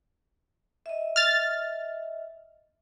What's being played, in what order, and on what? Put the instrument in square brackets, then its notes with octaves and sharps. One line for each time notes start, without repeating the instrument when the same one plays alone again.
[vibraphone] D#5 E5
[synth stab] F6 A6